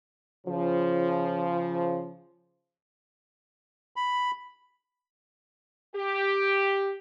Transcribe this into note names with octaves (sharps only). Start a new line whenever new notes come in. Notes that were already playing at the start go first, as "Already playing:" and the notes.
C#3 F3
B5
G4